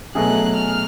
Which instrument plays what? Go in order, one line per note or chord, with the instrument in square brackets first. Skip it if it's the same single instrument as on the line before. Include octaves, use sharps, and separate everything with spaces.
[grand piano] B2 F#3 A3 C#4 G#4 [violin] F#6
[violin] F6